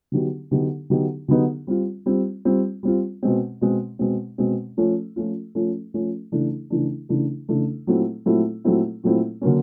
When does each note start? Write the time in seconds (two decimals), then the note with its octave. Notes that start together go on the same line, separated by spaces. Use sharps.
0.12 D3 F#3 B3 D#4 G4
0.51 D3 F#3 B3 D#4 G4
0.90 D3 F#3 B3 D#4 G4
1.28 D3 F#3 B3 D#4 G4
1.67 G3 C4 F4
2.06 G3 C4 F4
2.45 G3 C4 F4
2.83 G3 C4 F4
3.23 B2 G#3 C4
3.61 B2 G#3 C4
3.99 B2 G#3 C4
4.38 B2 G#3 C4
4.77 F3 A3 C#4 F4
5.16 F3 A3 C#4 F4
5.55 F3 A3 C#4 F4
5.94 F3 A3 C#4 F4
6.32 C#3 E3 A3 D4
6.70 C#3 E3 A3 D4
7.09 C#3 E3 A3 D4
7.48 C#3 E3 A3 D4
7.87 A#2 F#3 A3 C4 E4
8.26 A#2 F#3 A3 C4 E4
8.65 A#2 F#3 A3 C4 E4
9.03 A#2 F#3 A3 C4 E4
9.42 D3 F#3 A#3 C#4